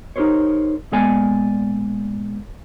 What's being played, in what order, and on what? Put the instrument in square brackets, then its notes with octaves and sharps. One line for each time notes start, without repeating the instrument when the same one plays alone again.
[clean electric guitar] D#4 G4 G#4 A#4 C5 C#5
A#2 G#3 B3 A4 D5 G#5